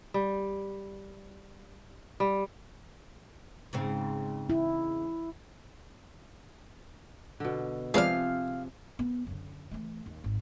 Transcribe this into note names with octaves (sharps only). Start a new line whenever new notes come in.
G3
G3
G#2 C#3 C4
E4
B2 D3
C3 F3 G#3 B3 D4 G#4 F5 F6
B3
F#2 D3
E3 A3
D#2
G#1